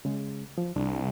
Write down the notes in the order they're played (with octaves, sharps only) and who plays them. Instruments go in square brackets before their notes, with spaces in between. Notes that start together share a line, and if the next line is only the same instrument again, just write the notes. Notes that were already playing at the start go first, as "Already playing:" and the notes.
[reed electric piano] C#3 G#3
F3
[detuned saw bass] C2 [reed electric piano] D4